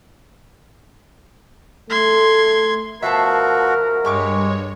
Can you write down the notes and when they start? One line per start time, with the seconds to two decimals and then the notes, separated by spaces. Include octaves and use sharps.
1.90 A3 C6 G#6
3.03 B2 F3 F#4 A#4 E5 F5 A5
4.05 G2 G#3 G4 C#5 C#6 D6